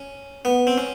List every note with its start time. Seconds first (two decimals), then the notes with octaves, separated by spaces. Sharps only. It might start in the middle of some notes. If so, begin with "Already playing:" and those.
Already playing: C#4
0.45 B3
0.67 C4
0.78 C#4